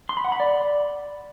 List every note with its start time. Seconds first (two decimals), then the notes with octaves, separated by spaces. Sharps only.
0.09 C6
0.17 B5
0.25 F#5
0.32 B5
0.40 D5